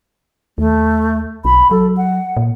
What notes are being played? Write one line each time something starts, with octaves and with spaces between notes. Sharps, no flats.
D#2 A3
B1 B5
F#3 A4
F#5
A#2